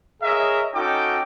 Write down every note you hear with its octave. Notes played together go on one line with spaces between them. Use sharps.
G#4 A#4 C#5 D#5 E5
C#4 D#4 F#4 A4 G5 D6